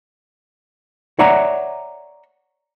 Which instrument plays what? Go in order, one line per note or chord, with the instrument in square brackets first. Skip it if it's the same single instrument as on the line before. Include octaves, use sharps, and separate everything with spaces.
[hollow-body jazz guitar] C#5 D5 E5 F#5 A#5